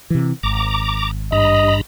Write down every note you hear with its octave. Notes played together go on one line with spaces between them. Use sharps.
C3 E3
G#1 A#5 D6
G2 D#5 A#5 B5